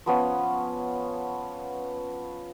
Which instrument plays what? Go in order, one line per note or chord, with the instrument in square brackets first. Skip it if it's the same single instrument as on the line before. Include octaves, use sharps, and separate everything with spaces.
[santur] F3 B3 C#4